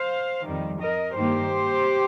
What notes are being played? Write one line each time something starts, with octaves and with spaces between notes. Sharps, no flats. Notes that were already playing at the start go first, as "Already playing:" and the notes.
Already playing: C5 F5
F2 D#3 G3
A#4 D#5
G2 D#3 A#3 G4 C5